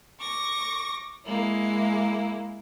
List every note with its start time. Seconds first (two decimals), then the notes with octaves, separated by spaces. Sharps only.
0.20 C#6 D6 A#6
1.25 G#3 A#3 E4